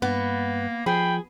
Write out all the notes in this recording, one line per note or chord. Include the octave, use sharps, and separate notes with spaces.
G2 A#3 B3
F3 G#4 G5 B5